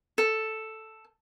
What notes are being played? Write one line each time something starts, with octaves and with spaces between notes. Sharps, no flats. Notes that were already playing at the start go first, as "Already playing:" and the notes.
A4